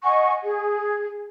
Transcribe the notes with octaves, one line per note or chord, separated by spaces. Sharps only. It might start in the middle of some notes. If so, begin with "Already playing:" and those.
D#5 F#5 G#5 C#6
G#4